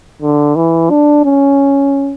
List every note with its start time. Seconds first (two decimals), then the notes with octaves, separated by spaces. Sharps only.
0.22 D3
0.56 E3
0.90 D4
1.25 C#4